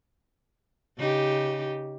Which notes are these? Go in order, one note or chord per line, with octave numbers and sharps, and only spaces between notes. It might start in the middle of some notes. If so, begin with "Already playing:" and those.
C#3 D#4 G4